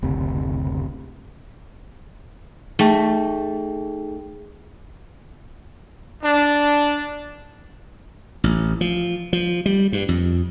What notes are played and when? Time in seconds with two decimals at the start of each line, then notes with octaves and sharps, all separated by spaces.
0.03 F#1 D2 C3
2.79 A3 D#4 G#4 G5
6.23 D4
8.44 A1
8.81 F3
9.33 F3
9.66 G3
9.92 G2
10.09 F2